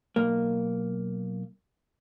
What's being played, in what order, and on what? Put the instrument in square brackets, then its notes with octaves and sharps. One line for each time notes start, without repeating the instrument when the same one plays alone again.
[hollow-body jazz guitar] B1 A#3